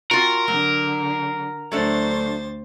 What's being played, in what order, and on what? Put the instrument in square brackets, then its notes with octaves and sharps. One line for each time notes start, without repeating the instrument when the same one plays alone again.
[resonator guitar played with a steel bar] C4 F4 F#4 [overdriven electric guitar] A#4
[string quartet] D3 [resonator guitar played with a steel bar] F#3
[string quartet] D2 C5 A6 [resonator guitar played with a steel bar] F#3 A3 D4